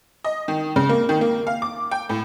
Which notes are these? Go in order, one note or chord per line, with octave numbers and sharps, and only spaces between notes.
D#5
D#3
C#3
A#3
D#3
A#3
F5
D6
G5
A2